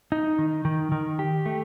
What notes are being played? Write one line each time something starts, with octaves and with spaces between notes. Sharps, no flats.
D#4
D#3
D#3
D#3
G4
A3